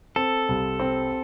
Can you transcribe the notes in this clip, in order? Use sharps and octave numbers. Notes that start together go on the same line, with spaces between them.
C4 A4
C2
C4